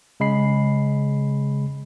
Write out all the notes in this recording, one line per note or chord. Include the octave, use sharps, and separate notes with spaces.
C#3 G#3 B5 C7